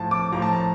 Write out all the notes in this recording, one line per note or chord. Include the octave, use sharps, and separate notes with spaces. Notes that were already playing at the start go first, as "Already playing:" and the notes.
Already playing: A2 F3 A5
D6
A2 F3 A#5
A5
A#5